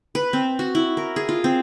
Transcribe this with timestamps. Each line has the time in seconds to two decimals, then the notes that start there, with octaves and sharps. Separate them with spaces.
0.15 B4
0.33 C4
0.59 F#4
0.75 E4
0.97 A#4
1.16 G#4
1.29 F4
1.44 C4